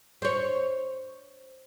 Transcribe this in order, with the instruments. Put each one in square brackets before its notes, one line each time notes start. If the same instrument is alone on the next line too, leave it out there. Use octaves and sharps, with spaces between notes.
[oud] C5 C#5